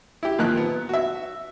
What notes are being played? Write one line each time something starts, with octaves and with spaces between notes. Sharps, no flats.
E4 G4
A#2 D#3 F3 F#6
B3
F#4 E5